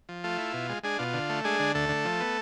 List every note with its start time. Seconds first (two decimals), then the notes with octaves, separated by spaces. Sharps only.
0.09 F3
0.24 A3 F4
0.38 E4
0.54 B2
0.69 G#3
0.83 G#3 D4 G#4
0.99 B2 F4
1.14 D3
1.30 A3
1.44 G#3 D4 G#4
1.60 D3
1.75 D2 A3 A4
1.89 D3
2.05 F3
2.20 B3